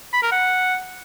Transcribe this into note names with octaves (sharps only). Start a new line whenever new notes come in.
B5
A#4
F#5